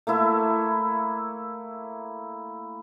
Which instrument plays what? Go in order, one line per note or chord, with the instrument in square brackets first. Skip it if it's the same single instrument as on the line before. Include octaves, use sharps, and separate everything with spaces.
[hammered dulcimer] A3 A#3 E4 E5